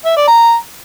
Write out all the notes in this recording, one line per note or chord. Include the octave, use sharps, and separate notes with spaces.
E5
D5
A#5